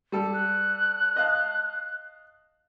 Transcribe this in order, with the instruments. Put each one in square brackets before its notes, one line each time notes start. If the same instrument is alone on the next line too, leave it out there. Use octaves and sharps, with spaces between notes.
[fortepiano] G3 A4
[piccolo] F#6
[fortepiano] D#5 F5 A5